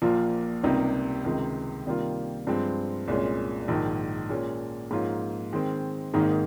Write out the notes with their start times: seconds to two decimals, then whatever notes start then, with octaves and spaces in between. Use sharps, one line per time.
0.02 A#1 A#2 F3 A#3 F4
0.63 C#2 C3 G3 A#3 D#4
1.24 C#2 C3 D#3 G#3 D#4
1.86 C3 D#3 G3 A#3 F4
2.47 G2 F3 G#3 C4
3.08 C2 A#2 G#3 C#4
3.68 A#1 G#2 D#3
4.29 A#2 G#3 C#4
4.91 G#2 F3 A#3 C#4 F4
5.53 D#3 G#3 C4
6.14 G#1 G#2 D#3 A#3 D#4